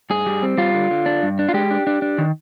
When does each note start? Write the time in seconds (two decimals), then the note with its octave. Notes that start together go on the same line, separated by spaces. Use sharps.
0.10 G2 G#4
0.26 G3
0.43 C4
0.58 G3 F4
0.74 D3
0.91 D3
1.06 D4
1.23 G2
1.39 D4
1.49 F4
1.54 G#3 G4
1.71 D4
1.87 D4
2.02 D4
2.18 D#3